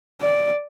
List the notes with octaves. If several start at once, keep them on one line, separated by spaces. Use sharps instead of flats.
D5